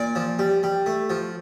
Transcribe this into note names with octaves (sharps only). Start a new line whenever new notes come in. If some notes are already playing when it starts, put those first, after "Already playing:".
Already playing: A#2 D5
F3
G3
G3
A3
F3